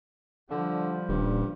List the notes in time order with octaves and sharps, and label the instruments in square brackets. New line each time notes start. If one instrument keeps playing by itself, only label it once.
[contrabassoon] D3 [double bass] F3 G3
[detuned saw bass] D#1 [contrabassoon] G2